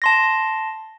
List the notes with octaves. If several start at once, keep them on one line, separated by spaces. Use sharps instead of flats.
A5 C6 A#6